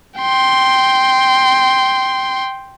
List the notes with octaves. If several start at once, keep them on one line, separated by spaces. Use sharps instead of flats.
G5 C6